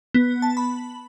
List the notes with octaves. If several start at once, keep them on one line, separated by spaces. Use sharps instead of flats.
B3
A5
B5